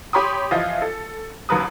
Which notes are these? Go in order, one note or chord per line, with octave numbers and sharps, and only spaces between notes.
G4 C#5 B5 C6 D6 D#6
E3 F3 F4 D#5
A4
A1 D#2 F#3 A#4 B4 D#6